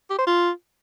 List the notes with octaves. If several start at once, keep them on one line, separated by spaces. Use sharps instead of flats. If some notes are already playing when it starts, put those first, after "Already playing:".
G4
C5
F4